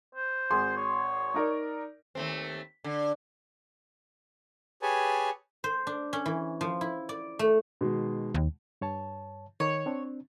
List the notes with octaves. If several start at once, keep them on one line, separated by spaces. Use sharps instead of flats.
C5
G#1 G#4 C6
C#5
D#4 A#4 D5
D#2 A3 C4
D3
G4 G#4 B4 C#5 G#5 A5
C5
D4
C#4
E3
F3
E4
D5
A3
B2 D#3 G#3
D#2
G2 C#5 A5
D#3 D#4 C#5
C4 D4